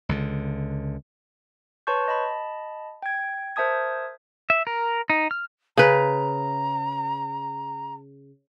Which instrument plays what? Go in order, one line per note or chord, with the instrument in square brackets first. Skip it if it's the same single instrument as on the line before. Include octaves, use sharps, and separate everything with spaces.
[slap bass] C#2 D3
[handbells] B4 C#5 A5 C6 C#6 G6
D#5 A5 B5
G5 G#6
A#4 C5 E5 A5 D#6 G#6
[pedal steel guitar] E5
A#4
D#4
F6
[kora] C#3 B4 [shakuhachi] A#5